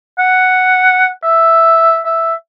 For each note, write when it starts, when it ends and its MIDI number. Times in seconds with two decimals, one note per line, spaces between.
0.19 1.09 78
1.24 2.00 76
2.06 2.33 76